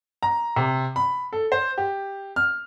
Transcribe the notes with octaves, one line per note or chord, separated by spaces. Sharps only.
A#5
C3
B5
A4
C5
G4
F6